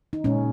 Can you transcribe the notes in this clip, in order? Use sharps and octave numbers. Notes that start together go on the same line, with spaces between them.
D#4
A#2 G#3 C#4